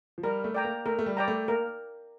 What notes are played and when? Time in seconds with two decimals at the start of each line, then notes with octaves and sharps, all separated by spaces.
0.18 F3
0.23 G3 A#4
0.44 A3
0.54 D5 G5 A#5
0.64 A#3
0.86 A3 A#4
0.99 A3
1.06 G3
1.17 D5 G5 A#5
1.28 A3
1.48 A#3 A#4